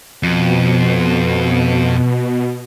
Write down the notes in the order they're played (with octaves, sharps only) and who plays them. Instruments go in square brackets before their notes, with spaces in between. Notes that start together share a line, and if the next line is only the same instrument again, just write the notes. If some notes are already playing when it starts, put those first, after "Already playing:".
[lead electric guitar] F2 [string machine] B2